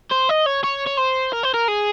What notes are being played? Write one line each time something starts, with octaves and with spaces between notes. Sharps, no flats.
C5
D#5
C#5
C#5
C#5
C5
A#4
C5
A#4
G#4